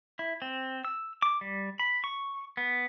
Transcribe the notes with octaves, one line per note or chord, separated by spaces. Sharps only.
E4
C4
E6
D6
G3
B5
C#6
B3